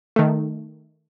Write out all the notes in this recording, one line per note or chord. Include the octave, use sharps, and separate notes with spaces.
D#3 A3